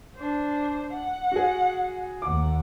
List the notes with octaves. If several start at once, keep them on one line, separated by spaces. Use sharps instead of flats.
D4 C5
F#5
F#4 G#4
D#2 F#5 D6